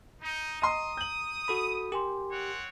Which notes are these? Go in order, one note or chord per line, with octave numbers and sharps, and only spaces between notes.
D#4
D#5 A#5 C6 D#6
G6 F#7
F#4 A4 B5
G4 A#4 G#5 C6
C4 C#5 F#5